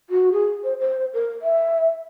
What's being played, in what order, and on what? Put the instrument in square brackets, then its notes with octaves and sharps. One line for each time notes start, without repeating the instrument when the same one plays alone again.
[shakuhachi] F#4
G#4
C5
C5
A#4
E5